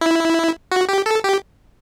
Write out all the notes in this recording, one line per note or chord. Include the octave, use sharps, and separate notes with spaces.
E4
F#4
G4
A4
G4